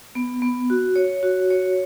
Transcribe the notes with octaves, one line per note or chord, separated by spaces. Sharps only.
B3
B3
F#4
C#5
F#4
C#5